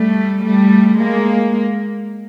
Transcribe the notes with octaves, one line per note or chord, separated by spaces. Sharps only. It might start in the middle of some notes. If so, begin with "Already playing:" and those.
Already playing: G3 A3
G3 A3
G#3 A#3